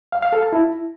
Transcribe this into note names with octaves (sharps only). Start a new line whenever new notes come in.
F5
F5
A4
A5
E4